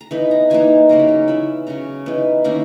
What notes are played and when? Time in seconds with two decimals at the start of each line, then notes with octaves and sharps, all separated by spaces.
0.01 A#5
0.11 E3 B3 D#4 B5
0.31 A#5
0.50 E3 A#3 D#4 G#5
0.89 C#3 F#3 A#3 C#4 A#5
0.99 B5
1.08 A#5
1.28 E3 B3 E4 B5
1.67 C#3 F#3 C#4 A#5
2.06 E3 B3 D#4
2.44 D#3 A#3 C#4 E4 A#5